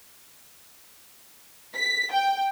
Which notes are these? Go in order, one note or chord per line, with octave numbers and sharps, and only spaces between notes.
B6
G5